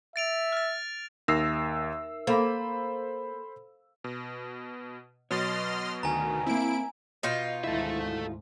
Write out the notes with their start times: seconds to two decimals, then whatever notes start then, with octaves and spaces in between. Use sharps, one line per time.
0.16 E5 A6 D7 F7
0.52 F6 A6
1.28 D#2 D#4 A#4 E5 E6 C7
2.27 A#3 A4 C5 B5
4.04 B2
5.31 B2 F#3 C#5 D#5 C6 F6 A6
6.03 D2 D#3 G#5 A#5
6.46 A#3 C4 E4 D7
7.23 B2 D#4 F4
7.64 G#1 D2 G#2 E4 A4 E5